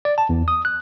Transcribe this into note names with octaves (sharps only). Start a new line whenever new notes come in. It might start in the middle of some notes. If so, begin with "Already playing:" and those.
D5
A5
E2
D#6
F#6